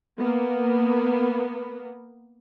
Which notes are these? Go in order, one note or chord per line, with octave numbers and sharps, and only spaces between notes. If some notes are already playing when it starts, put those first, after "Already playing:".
A#3 B3